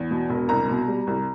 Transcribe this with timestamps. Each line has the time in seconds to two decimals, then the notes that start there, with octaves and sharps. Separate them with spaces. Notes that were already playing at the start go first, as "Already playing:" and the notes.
Already playing: E2
0.11 B2
0.30 E1
0.49 C2 A#5
0.69 B2
0.88 G3
1.07 C2